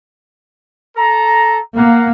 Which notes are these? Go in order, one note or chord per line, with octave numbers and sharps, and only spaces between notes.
A4 A#5
A#3 F5 F#5 A#5